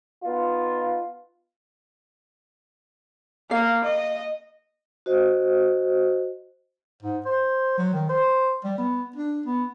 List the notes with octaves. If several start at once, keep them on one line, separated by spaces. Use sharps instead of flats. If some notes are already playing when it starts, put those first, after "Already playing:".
B3 D#4 F4
A#3 F5
D#5
F#4 C5 D#5
G#2
C5
F#3
D#3
C5
G3
B3
D4
B3